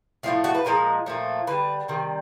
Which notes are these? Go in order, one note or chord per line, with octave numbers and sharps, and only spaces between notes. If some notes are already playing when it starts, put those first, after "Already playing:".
A2 F3 A3 F4
F#4
B4
A#2 F3 G#3 A#4
A#2 F3 A3
D3 G3 B4
C3 D#3 G3